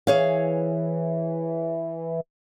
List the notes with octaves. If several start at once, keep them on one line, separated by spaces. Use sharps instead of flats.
E3 G#4 C#5 F5